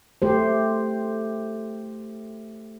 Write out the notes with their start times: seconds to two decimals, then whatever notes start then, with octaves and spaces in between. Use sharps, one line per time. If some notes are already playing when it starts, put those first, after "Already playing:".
0.22 A3 G4 C5